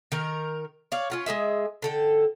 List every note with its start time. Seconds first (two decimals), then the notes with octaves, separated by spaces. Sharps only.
0.12 D#3 A#4
0.92 C#5 D5 F5
1.10 C#4 F4 F#5
1.26 G#3 G4 G#4 E5
1.82 D3 A4 G5